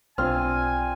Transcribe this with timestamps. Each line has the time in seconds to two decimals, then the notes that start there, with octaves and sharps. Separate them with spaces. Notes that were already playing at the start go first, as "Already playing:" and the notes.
0.18 B1 C4 D4 F4 G#5 F6